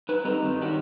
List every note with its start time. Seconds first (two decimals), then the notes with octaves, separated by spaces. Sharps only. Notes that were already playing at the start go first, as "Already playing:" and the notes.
0.09 D#4 B4
0.25 G3 C4 G4 A4 D#5 A#5
0.42 G2 D#3 D#4
0.61 C#4 D4 F#4 G4